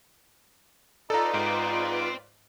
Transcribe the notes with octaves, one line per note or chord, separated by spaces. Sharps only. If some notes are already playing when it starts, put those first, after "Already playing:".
D#4 F4 A4 B4 D5 A#5
G#2 C5 G5